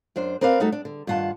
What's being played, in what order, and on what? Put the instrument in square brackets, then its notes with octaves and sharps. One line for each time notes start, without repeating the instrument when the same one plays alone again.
[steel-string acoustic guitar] F#2 D4 C5
C4 A#4 B4 D5 F5
G3 A3 D#4 F#4 A4
D4
D3
G2 D#3 F4 F#5 A5